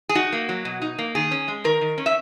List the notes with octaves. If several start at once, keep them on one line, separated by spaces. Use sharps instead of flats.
G#4
D#4 F#4
A#3
F#3
B2
D#4
A#3
D#3 G#4
C#4
G#3
D#3 A#4
D#3
C#4
E5